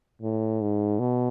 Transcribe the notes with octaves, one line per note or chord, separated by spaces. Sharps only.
A2
G#2
B2